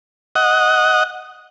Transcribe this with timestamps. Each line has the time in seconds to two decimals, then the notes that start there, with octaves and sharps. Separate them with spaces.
0.35 D#5 F#5